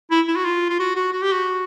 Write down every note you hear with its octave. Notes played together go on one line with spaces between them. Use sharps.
E4
E4
F#4
F4
F4
F#4
F#4
F#4
G4
F#4